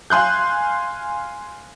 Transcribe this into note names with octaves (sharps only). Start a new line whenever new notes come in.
F5 G#5 C6 F#6 G6